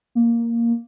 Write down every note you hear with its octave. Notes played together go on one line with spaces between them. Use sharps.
A#3